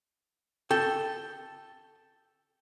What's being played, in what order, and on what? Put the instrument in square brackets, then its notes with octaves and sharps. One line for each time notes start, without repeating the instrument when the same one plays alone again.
[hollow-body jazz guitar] A4 G5